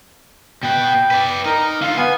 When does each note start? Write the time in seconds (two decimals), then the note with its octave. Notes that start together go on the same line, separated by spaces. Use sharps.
0.63 B2 B4 G5
1.11 B4 D5
1.45 D#4 A#4
1.82 D3 F4 F5
1.98 B3 G#5